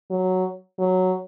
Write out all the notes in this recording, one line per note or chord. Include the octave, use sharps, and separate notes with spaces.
F#3
F#3